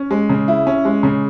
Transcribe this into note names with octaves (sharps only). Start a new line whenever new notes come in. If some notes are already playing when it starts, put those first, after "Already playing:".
Already playing: C#4
G#3
C#3
E4
C#4
G#3
C#3